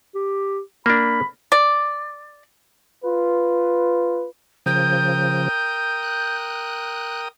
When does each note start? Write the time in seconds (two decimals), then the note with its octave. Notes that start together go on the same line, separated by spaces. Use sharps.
0.15 G4
0.86 A#3 D4 B5
1.52 D5
3.03 F4 B4
4.66 C#3 F3 A#4 G5 D#6 G6
6.03 F#6